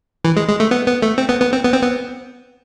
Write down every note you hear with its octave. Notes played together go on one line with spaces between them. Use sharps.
E3
G#3
G#3
A3
B3
B3
A3
C4
B3
B3
C4
B3
C4
B3